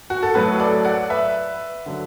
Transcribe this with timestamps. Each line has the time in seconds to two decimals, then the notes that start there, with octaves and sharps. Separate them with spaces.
0.10 F#4
0.23 A4
0.34 A2 F#3 F#4 B4
0.60 A4 D5
0.85 D5 F#5
1.10 B4 E5
1.86 D3 F#3